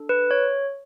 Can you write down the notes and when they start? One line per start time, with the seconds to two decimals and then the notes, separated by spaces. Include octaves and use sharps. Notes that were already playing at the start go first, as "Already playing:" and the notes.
Already playing: D4 A4
0.09 B4
0.31 C#5